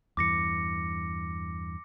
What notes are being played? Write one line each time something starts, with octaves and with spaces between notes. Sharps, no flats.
E2 G2 E3 D6 A#6 C#7